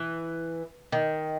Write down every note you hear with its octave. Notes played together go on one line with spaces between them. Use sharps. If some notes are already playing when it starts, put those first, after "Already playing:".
Already playing: E3
D#3